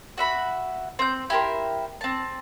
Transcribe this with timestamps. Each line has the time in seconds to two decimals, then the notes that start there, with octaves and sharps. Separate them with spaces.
0.18 F#4 E5 B5
0.99 C4 G6
1.30 E4 G4 A#4 C5
2.01 C4 A5